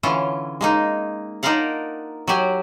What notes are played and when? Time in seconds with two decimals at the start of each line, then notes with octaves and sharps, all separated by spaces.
0.03 D3 E3 C#4 F4
0.61 G#3 A#3 D#4
1.43 D4 D#4 F4 A#4 F5 F#5
2.27 F#3 F#4 G4 G#5